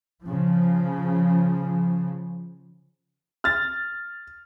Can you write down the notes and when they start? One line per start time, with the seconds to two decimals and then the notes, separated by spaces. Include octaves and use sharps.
0.24 C#3 F3
3.44 F6 A6